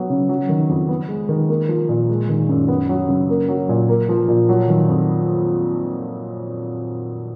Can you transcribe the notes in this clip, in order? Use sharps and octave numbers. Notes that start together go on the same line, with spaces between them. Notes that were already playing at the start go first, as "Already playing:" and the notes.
Already playing: F#3 B3
C#3
F#3
D#3
F2
B3
G#3
D#3
A#3
F3
A#2
G#3
D#3
F#2
B3
F#3
C#3
A#3
F#3
A#2
A#3
F3
A#2
F#3
D#3
F2